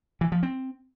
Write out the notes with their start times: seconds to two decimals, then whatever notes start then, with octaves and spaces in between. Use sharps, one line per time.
0.21 E3
0.32 F3
0.43 C4